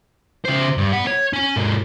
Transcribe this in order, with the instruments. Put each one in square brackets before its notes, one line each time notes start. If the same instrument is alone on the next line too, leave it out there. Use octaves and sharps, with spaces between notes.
[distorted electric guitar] C#3 C5
G2
B4 F#5
C#5
C#4 G#5
G#2 A#3